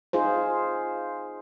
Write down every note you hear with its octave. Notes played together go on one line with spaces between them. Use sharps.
D#4 F4 G#4 C5